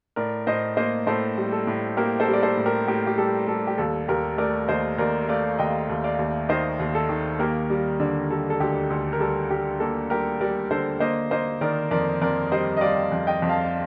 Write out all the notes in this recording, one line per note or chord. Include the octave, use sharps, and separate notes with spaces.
A2 A#4 D5
A2 C5 D#5
A#3 C5 D#5
A2 A4 C5
G3
A4
A2
A#3 G4 A#4
A4 C5
G3
D5
A4 C5
A2
G4 A#4
A2 G4
G4
G3 A4
G3 A4
G4
D#2 A4
D#2 G4 A#4
A3 A#4 D5
D#2 C5 D#5
D#2 A#4 D5
A3 D5 F5
D#2 D#5 G5
D#2
D5 F5
D#2
D#3 C5 D#5
D#2
A4
D#3
A#3 G4 A#4
G3
D3
G3 A4
A4
D2 G4
D2
A#4
G3 A4
G3 G4
A#3 A4
G3 G4 A#4
G3 A#4 D5
D3 A4 C5
A#3 C5 D#5
A#3 C5 D#5
D#3 A#4 D5
F2 A#4 D5
F2 A#4 D5
G3 C5 D#5
D#5
G3 D5 F5
F2
D#5 G5
F2
F5 A5